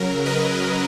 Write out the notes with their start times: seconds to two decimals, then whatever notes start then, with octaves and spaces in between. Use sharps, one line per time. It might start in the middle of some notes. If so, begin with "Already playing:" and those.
Already playing: C#3 F#3 A#4
0.26 B4 D#5